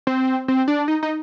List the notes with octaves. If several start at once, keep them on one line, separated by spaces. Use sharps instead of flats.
C4
C4
D4
D#4
D#4